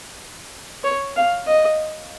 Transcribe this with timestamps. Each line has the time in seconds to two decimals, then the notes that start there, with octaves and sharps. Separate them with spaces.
0.84 C#5
1.16 F5
1.47 D#5